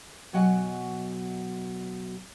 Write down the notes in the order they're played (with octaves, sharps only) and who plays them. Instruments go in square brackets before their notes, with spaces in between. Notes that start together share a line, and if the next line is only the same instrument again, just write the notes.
[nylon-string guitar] B2 F#3 D#5 F#5 G#5